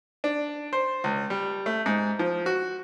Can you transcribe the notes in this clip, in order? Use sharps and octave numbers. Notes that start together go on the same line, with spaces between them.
D4
C5
C#2
G3
A3
G#2
F3
F#4